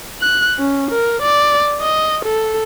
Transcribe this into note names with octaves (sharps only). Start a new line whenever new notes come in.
F#6
C#4
A#4
D5
D#5
A4